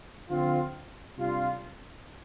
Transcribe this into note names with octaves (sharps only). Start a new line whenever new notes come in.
D3 F3 C4 F4
C3 G3 D4 F4